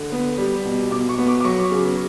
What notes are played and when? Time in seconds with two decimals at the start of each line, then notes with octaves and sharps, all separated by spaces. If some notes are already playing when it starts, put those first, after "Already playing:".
Already playing: D3
0.12 B3
0.38 G3
0.65 B2
0.91 B2 D6
1.09 C#6
1.18 B3
1.27 D6
1.40 D6
1.44 F#3 C#6
1.71 C#3